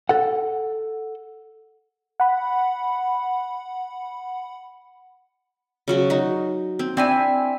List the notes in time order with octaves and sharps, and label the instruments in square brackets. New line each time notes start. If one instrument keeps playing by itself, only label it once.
[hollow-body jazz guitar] A4 F#5
[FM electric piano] F#5 B5
[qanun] C#3 F#3 F#4
D#4 F#4
C4
[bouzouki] C4 E4 G#5 [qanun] D4